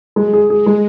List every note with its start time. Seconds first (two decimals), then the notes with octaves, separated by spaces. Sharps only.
0.16 F#3 G#3
0.33 G#4
0.50 G#3 G#4
0.66 G#3